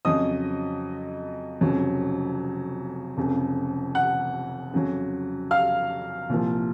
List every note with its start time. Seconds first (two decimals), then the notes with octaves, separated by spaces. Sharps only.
0.05 F2 C#3 F#3 D#5 D#6
1.61 F1 F2 C#3 F#3
3.17 F1 F2 C#3
3.95 F#5 F#6
4.73 F2 C#3 F#3
5.51 F5 F6
6.29 C2 A#2 F3